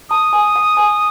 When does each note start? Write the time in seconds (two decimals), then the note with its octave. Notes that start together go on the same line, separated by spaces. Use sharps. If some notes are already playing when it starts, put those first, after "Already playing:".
0.10 A5 D#6
0.33 G#5
0.56 F#5
0.77 G#5